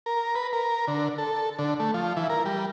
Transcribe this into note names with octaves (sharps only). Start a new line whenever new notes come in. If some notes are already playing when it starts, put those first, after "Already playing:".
A#4
B4
A#4
D3
A4
D3
A3
F3
E3
A#4
G3